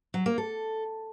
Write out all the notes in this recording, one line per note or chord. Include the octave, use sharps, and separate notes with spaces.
F#3
A#3
A4